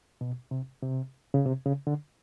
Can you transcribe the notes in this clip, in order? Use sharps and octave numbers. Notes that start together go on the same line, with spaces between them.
B2
C3
C3
C#3
C3
C#3
D3